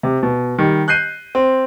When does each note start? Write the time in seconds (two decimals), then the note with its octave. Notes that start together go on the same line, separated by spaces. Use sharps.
0.03 C3
0.23 B2
0.58 D#3 G3
0.88 F#6 G6 C7 D#7
1.35 C4